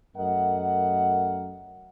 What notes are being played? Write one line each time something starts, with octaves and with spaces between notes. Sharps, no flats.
F#2 A3 A#4 D#5 F#5